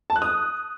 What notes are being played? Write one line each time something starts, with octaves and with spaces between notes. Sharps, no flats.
A5
F#6
D#6